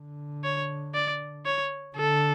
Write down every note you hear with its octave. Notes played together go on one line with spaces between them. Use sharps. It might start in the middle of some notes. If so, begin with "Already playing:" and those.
Already playing: D3
C#5
D5
C#5
D3 A4